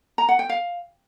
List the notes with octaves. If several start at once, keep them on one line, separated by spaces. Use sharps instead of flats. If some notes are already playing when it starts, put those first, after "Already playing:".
A#5
F#5
G5
F5